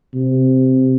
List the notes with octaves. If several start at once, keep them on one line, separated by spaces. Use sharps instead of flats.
C3